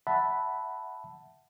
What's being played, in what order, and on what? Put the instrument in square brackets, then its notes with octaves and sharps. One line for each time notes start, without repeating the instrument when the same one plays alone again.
[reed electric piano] E5 F#5 A5 B5